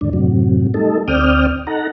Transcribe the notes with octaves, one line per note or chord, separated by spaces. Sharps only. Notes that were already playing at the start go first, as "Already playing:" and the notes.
D#2 G#2 D3 D4
F#2 A2 C3 F#3
G3 A3 D#4 A4
D2 C4 D5 G5 D#6 F6
D#4 A4 F#5 A#5